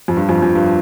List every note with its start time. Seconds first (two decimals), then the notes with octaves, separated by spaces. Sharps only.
0.08 F2
0.17 G2
0.29 F2
0.42 F2
0.55 G2